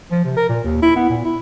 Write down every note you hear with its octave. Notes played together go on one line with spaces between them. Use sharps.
F3
C3
A#4
A#2
D#2
E4
B3
A#2
E4